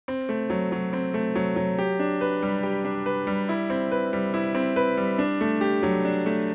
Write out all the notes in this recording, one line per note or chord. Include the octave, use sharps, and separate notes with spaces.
C4
A3
F#3
F#3
C4
A3
F#3
F#3
G4
D4
B4
G3
G4
D4
B4
G3
E4
C4
B4
G3
E4
C4
B4
G3
D4
A3
G4
F#3
D4
A3